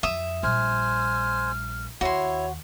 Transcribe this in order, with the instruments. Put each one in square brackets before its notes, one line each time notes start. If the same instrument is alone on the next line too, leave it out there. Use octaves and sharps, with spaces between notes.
[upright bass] F2 [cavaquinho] E5 D#6
[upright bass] A#1 G3 [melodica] C5 G#5 [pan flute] F6
[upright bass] D#2 [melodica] E4 [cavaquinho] F#4 C6 [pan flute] C#5